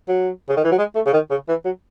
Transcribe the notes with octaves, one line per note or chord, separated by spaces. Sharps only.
F#3
C#3
D#3
E3
F#3
G#3
A3
C#3
D#3
C#3
E3
F#3